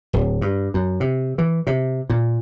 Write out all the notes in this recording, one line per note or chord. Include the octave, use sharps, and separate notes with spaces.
D1
G2
F#2
C3
E3
C3
A#2